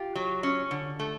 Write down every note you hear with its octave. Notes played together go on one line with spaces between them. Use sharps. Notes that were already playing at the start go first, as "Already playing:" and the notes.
Already playing: F4 G4
F#3
C#4
D3
A3